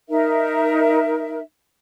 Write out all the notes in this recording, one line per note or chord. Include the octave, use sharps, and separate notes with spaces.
D#4 A#4 E5